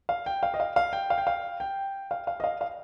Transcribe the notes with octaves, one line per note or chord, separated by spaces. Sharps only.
F5
G5
F5
D#5
F5
F5
G5
F5
G5
F5
G5
F5
F5
D#5
F5
F5